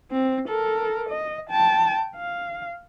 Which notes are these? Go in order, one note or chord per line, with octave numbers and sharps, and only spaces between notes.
C4
A4 A#4
D#5
G5 A5
F5